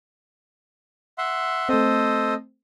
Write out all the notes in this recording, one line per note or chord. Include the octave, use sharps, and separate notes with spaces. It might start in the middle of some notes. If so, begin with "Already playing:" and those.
E5 F#5 C6
A3 C4 A4 C5 D#5